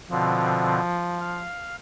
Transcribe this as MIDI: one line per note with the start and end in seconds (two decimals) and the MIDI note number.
0.11 0.80 47
0.11 0.80 50
0.11 1.46 53
0.11 0.80 60
1.21 1.76 77